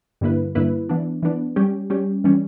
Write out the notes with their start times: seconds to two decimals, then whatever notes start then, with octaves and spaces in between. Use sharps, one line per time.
0.21 G2 D3 A#3 E4 B4
0.55 G2 D3 A#3 E4 B4
0.89 E3 B3 D4
1.23 E3 B3 D4
1.56 G3 C#4 G4
1.90 G3 C#4 G4
2.24 E3 G3 C#4